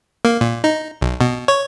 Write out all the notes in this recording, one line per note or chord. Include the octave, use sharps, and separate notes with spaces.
A#3
A#2
D#4
B1
B2
C#5